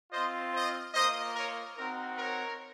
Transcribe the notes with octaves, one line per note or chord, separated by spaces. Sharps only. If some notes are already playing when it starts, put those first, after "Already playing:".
C4 F4 C5 D#5
C5 D#5
A#3 F4 C5 D#5
A#4 C#5
C4 D#4 F#4 A#4
A#4 C#5